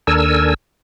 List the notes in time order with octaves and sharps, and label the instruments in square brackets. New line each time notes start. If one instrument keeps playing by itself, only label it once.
[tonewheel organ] D#2 D4 A4 A#4 G#5 E6